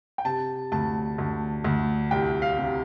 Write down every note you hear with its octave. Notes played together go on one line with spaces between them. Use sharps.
G5
C3 A5
D2 A5
D2
D2
C2 G5
F5
C3